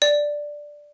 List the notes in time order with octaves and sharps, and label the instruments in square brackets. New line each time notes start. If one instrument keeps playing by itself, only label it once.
[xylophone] D5